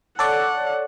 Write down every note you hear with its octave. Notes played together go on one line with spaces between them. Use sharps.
A4 C#5 D5 F#5